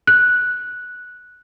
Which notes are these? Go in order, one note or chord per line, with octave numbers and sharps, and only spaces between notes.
F#6